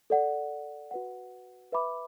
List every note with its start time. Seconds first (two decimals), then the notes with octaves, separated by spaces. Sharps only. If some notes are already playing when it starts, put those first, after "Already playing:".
0.10 A4 D5 F#5
0.91 F#4 B4 F#5
1.72 B4 E5 B5 D6